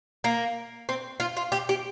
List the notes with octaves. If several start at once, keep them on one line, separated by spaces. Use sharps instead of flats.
A#3
C4
F4
F4
G4
G4